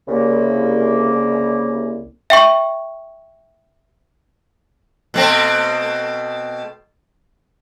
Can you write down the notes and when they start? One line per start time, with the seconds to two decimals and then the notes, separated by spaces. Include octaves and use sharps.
0.08 C2 C#3 A#3
2.30 E5 G5 C#6
5.14 B2 A3 C4